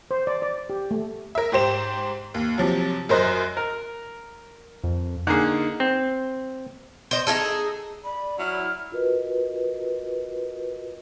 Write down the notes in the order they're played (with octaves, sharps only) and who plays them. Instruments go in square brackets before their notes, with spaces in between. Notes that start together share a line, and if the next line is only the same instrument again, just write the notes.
[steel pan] C5
D5
D5
G4
A3
[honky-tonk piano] A#4 E5
G#2 G4 C5 E7
D#2
C3 F3 F#3
F#2 A#4 C5 D#5 F#6
[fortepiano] A#4
[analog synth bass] F2
[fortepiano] D3 A#3 G#4 [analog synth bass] D#4
[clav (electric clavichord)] C4
[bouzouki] C5 D#5
D#4 F4 G#4 A4
[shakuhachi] D5 [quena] B5
[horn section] F#3 E4 [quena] F6
[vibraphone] F4 F#4 A#4 B4 D#5